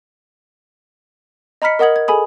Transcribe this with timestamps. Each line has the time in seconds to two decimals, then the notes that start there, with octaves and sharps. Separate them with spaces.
1.62 D#5 A#5 B5 F6 B6 C#7
1.79 A#4 D#5 F#5 D#6 G#6 F#7
1.96 G#6
2.08 G#4 A4 G#5 B5 D#6